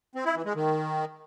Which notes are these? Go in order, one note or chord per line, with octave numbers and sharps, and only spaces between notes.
C4
E4
E3
G#3
D#3